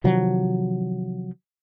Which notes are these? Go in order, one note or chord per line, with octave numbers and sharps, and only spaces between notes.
C3 D#3 F3 F#3